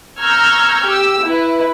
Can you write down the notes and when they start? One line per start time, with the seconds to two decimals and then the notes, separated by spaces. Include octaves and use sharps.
0.21 A#5 C#6 E6 F6 G6 G#6
0.86 G4 E6
1.26 E4 B4